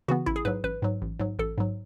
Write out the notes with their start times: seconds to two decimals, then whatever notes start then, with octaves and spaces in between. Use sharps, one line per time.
0.08 C#3 E3 B3 F#4
0.26 A1 E4
0.36 G#4
0.45 G#2 F#3 B4
0.64 A1 B4
0.82 G#2 F#3
1.02 A1
1.20 G#2 F#3
1.39 A1 A4
1.58 G#2 F#3